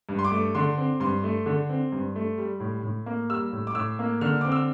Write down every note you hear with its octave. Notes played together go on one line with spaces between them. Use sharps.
G2
C6
D6
A3
D3 C6
C4
G2 C6
A3
D3
C4
G2
A3
G3
A2
A2
A#3
G3 E6
A2
D6
A2 E6
A#3
D3 F6
C4 D6
E6